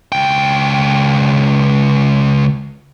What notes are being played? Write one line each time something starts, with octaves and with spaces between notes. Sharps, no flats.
C#2 G5